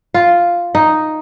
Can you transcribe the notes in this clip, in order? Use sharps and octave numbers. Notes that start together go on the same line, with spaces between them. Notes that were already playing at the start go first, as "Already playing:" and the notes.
F4
D#4